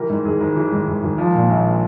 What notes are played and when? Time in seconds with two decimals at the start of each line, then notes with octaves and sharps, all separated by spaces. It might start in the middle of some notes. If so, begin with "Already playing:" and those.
Already playing: E3 G4 A#4
0.09 G#2
0.25 G#1 G#4
0.40 G#1
0.56 E3 G4
0.72 G#2
0.87 G#1
1.03 G#1
1.18 F3
1.34 A#2
1.50 A#1